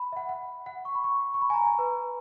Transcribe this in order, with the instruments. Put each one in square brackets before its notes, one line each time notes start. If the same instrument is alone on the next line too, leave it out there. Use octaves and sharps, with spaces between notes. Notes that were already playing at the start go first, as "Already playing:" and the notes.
Already playing: [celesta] B5
E5
F#5
F#5
F#5
C#6
B5
C#6
C#6
B5
G#5
A#5
G#5
B4